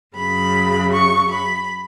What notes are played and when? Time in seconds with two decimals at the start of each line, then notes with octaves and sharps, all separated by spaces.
0.16 F#2 C#3 F#3 B5
0.93 C#6
1.32 B5